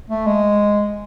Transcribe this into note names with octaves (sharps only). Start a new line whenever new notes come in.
A3
G#3